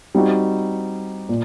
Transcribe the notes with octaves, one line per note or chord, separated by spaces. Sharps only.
G3 C4 D#4 F#4
A#2